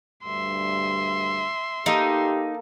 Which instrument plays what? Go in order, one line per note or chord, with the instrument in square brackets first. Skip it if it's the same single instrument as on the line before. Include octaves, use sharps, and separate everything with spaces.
[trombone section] D2 G2 G3 [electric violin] E5 C6
[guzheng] A#3 A4 [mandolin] D#4 [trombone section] G4